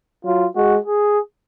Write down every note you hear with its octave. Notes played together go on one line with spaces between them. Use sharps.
F#3 F4
G#3 F#4
G#4